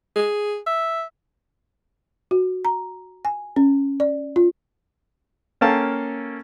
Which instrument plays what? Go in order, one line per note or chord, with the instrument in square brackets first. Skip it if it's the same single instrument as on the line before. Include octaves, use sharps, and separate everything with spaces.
[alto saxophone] G#4
E5
[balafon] F#4
A#5
G#5
C#4
D5
F4
[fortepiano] A#3 C#4 A4 F5 G5 A5